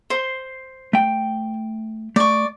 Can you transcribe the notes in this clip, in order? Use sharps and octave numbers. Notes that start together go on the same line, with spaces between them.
C5 C6
A3 G5
A3 D5 C#6